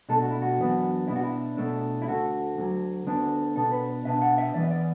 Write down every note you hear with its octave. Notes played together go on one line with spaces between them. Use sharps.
B2 A3 D4 A4
F#4
E4
F#4
F#2 E3 B3 D4
B2 B3 D4 E4
F#4
E4
B2 A3 D4
E4
D2 D3 A3 F#4
D2 D3 F#3
D2 D3 B3 D4
B2 B3 D4 A4
B4
B2 B3 D4 E5
F#5
E5
E2 E3 B3 D5
E5
D5